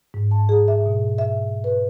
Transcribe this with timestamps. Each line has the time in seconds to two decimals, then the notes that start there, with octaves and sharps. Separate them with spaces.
0.14 G#2
0.31 A5
0.49 G#4
0.68 E5
0.86 B2
1.18 E5
1.64 B4